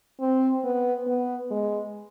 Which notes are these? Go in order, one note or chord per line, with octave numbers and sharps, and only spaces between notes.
C4
B3
B3
G#3